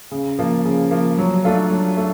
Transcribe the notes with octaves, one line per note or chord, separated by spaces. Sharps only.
C#3
F3 A#3
C#3
F3 A#3
F#3
A3 D4 F4 A4
F#3
A3